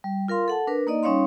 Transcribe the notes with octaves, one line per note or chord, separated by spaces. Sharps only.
G3
F4 A#4 F5 C6
A4 F#5 A5
D4 A#4 B4
A#3 D#4 D5 D#5
G3 C#4 D#4 C#5 F5 C6